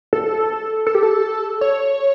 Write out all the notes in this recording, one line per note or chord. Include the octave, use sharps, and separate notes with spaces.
A4
A4
G4
A4
C#5